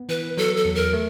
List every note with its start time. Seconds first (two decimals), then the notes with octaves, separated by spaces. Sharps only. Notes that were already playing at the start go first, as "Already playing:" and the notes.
Already playing: B3
0.09 E3 B4
0.37 F#3 A4
0.57 A4
0.65 E2
0.75 A#4
0.93 A3